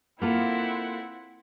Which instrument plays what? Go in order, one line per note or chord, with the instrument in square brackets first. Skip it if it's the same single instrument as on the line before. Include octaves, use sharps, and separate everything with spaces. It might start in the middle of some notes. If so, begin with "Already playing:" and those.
[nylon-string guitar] A#3 F4 A4 [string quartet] C4 E4 F#5